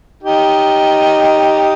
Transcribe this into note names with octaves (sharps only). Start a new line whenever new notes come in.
D#4 G4